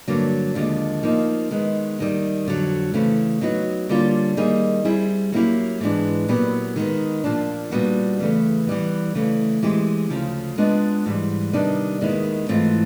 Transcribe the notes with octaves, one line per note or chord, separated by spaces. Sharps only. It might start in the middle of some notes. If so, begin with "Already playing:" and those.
G2 D3 F#3 A#3
D#2 D3 F3 G#3
F3 A#3 D#4
D#3 G#3 B3
D#2 D#3 G3
F2 D3 F#3
C#3 E3 A3 C4
F#3 B3 D#4 F#4
D3 G3 A#3 C#4 F4
D#3 G3 A#3 D#4 G#4
G3 C4 E4 G#4
F#3 A#3 C#4 E4 G4
G#2 E3 G#3 B3 D4
A#2 F#3 B3 E4 G4
D#3 G#3 B3
A#2 F3 A#3 D4
A#2 G3 B3 D4 F#4
E2 C#3 E3 A3
E3 G3 B3
C#3 E3 A3
E3 G#3 C4 E4 G4
D2 C#3 F3
G#3 B3 D4 F4
G#2 E3 G3
C3 D#3 G3 B3 D4
D#2 D#3 G#3 B3 E4
G#2 E3 A3 C4 F4